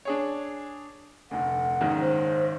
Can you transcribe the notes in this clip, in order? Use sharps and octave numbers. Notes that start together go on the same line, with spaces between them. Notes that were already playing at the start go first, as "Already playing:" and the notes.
D4 G#4 C#5
F1 D2 F#5
F#1 G#2 D#3
C5